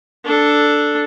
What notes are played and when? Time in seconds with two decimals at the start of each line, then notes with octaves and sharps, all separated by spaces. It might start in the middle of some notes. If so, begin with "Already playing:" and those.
0.25 D4 A4